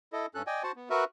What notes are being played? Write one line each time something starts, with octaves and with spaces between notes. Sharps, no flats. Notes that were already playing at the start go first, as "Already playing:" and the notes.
E4 A4 D#5
G2 C#4 A4 F#6
D5 D#5 G5 G#5
F#4 C5 F#5 A5
B3
F#4 A#4 B4 E5